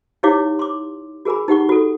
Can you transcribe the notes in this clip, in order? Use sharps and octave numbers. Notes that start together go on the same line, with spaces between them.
D#4 E4 G4 C#5 F5 D6
C6 D6
F#4 G#4 A#4 G#5 B5
D#4 G4 F#5 C#6
F#4 A4